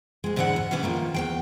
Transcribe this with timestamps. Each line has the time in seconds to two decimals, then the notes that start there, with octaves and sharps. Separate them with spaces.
0.24 D2 G#3
0.36 G#2 D3 E3 G#3 D4 F#5
0.56 D2
0.71 B2 D3 E3 B3 C#4
0.83 D#3 F3 A#3
1.14 E2 C3 G5